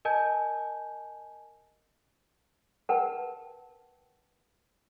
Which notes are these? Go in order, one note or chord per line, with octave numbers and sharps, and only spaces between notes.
A#4 D#5 G#5 A5 G6
A#4 B4 F#5 G5 A5